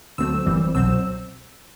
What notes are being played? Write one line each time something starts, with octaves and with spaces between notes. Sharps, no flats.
D2 D3 F#3 A3 C4 E6
G1 F#2 E3 G3 C4
C2 B2 F#3 C4 E6